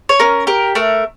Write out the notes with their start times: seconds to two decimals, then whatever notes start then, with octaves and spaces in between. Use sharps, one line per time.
0.09 C#5
0.20 C#4 A#4
0.47 G4 A#4
0.75 A3 A#4